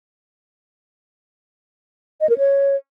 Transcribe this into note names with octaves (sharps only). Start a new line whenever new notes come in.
D#5
A#4
C#5